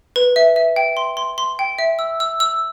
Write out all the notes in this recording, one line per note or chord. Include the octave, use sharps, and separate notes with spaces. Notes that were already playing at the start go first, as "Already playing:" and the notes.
B4
E5
E5
G5
C6
C6
C6
G5
E5
E6
E6
E6